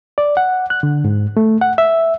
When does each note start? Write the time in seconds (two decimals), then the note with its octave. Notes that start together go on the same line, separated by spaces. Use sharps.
0.18 D5
0.37 F#5
0.70 F#6
0.83 D3
1.05 G#2
1.37 A3
1.61 F#5
1.78 E5